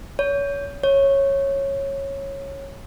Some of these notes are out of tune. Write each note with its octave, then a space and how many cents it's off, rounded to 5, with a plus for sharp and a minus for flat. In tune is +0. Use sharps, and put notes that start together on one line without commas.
C#5 +25
C#5 -10